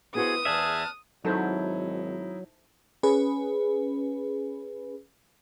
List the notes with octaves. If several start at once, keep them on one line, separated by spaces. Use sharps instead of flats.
B3 E4 F#4 G#4 C5 D#6
E2 G#4 D5 E5 A5 F6 F#6
G#1 F#3 D#4 E4 A4 C5 E5
C#4 G#4 B4